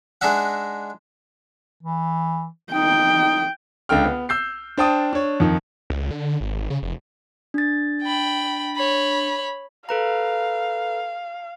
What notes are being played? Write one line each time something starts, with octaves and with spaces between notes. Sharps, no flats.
G#3 D4 D#4 E5 F#5
E3
D#4 G5
C#2 D3 A4 G5 F6
B3
E6 G6 C7
D4 C5 G5 A5 D#6
D4 C#5
F2 D#3
C#2
D3
G#1
C#3
F1
D4 A6
G5 B5
C#5 B5
A4 B4 F5 A#5